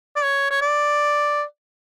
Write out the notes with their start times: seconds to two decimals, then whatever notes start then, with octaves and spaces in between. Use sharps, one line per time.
0.16 D5
0.23 C#5
0.50 C#5
0.61 D5